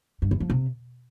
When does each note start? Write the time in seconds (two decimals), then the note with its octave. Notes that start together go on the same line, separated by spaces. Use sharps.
0.22 G2
0.31 E2
0.40 F3
0.50 C3